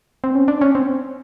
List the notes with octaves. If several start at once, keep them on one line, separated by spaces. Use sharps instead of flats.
C4
C#4
D4
C#4
C4